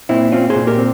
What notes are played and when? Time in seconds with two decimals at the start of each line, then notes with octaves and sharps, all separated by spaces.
0.09 A#2 C4 E4
0.32 C4 C#4 F4
0.50 G#4 C5
0.56 A#2
0.67 G4 A#4
0.78 C4